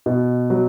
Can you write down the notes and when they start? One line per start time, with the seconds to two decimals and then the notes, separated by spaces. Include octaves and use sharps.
0.06 B2
0.50 F#3